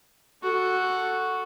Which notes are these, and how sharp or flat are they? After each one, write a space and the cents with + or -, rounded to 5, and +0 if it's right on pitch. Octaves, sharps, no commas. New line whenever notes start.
F#4 +0 A4 +5